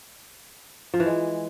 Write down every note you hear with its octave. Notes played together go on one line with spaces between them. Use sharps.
F3
E3
G#3